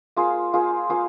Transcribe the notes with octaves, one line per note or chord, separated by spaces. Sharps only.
A#3 F4 G#4 C5
A#3 F4 G#4 C5
A#3 F4 G#4 C5